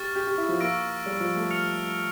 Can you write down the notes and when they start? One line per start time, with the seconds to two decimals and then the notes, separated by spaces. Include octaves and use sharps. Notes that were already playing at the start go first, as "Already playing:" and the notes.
Already playing: G4 C#6 F6 A6
0.15 G4
0.27 G4
0.38 E4
0.49 F3
0.60 A#3 C#6 E6 A#6 D7
1.06 G3
1.20 F3
1.36 A3
1.50 F6 C#7 F7